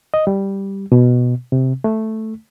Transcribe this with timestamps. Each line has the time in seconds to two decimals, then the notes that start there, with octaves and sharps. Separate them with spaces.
0.14 D#5
0.27 G3
0.92 B2
1.52 C3
1.84 A3